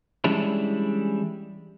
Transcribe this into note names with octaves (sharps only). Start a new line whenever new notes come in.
E3 G3 G#3 C#4 D4 E4